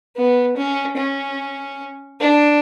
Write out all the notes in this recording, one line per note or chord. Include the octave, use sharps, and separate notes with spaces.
B3
C#4
C#4
D4